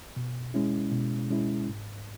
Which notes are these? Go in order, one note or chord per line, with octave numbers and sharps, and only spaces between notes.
B2
G#3 C#4 E4
B2
G#3 C#4 E4
G#2